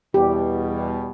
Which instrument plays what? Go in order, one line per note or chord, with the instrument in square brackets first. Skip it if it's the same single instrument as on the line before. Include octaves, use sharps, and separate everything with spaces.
[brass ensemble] E2 B2 G3 [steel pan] G4